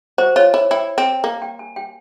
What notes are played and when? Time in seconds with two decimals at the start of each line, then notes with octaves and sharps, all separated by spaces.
0.18 F#4 C5
0.36 F4 C#5
0.54 E4
0.71 E4 G5
0.98 C4 G5
1.24 A#3 G5
1.42 G5
1.59 G#5
1.76 G5